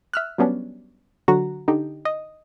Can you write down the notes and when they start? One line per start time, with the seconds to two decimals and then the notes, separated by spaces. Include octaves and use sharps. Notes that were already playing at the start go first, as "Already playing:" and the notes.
0.14 E5 F6 F#6
0.38 F#3 G3 B3 C#4 D4
1.28 D3 F#3 F#4 A#5
1.68 D3 D#4 G4
2.05 D#5